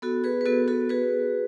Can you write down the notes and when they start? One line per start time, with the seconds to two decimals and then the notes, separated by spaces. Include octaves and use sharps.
0.02 B3 F#4 A4
0.24 G#4 B4
0.41 B4
0.46 B3 F#4 A4
0.68 F#4 A4
0.89 F#4 G#4 B4